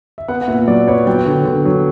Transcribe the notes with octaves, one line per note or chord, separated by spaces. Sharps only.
E5
B3 F#5
F#5
A#2 E5
F#3 D5
B3 C#5
F#3 G5
D3
D3
F#3